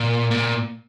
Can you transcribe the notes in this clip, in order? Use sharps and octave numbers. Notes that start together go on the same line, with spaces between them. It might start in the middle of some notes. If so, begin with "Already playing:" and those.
Already playing: A#2
A#2